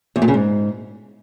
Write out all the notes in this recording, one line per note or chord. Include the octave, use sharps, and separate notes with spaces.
E2
A#2
C#3
G#2